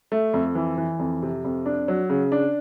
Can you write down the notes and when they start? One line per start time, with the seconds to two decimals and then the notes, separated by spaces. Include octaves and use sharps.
0.12 A3
0.34 F2
0.55 E3
0.78 E3
0.99 F2
1.23 C3
1.44 F2
1.66 D4
1.88 F#3
2.10 C#3
2.32 D4